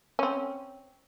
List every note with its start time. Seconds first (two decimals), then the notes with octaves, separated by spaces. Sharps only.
0.19 C4 C#4